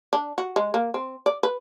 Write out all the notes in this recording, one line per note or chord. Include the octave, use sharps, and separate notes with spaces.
D4
F#4
G#3
A#3
C4
D5
B4